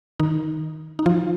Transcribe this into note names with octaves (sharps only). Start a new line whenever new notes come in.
D#3 D#4
D#4
F3 F4